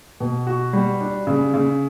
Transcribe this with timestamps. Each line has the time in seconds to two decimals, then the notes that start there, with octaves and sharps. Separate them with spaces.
0.20 B2
0.47 F#4
0.73 G3
1.01 D4
1.27 C#3
1.54 C#3